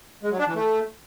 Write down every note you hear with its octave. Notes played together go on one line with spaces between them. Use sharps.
G#3
F#3
D4
E3
A3